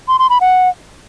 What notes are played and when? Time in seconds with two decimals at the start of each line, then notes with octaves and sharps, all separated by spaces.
0.08 C6
0.19 C6
0.30 B5
0.41 F#5